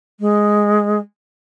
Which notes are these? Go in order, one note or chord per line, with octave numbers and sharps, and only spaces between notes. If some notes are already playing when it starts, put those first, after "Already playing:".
G#3